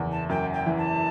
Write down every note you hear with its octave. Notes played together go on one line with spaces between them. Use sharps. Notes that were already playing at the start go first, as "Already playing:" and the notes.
Already playing: F#1 E2
A5
F#2 G5
G5
E3
A5